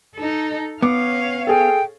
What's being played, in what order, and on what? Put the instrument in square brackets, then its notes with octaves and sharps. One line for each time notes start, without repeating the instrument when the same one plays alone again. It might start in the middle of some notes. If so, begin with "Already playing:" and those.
[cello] D#4 A4
[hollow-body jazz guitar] B3 [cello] C#4 F5 [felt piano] D6
[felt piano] G#4 A4 [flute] G5